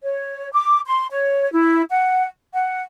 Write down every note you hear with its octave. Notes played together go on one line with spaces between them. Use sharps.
C#5
D6
C6
C#5
E4
F#5
F#5